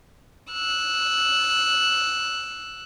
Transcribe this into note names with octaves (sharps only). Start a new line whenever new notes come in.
E6 F#6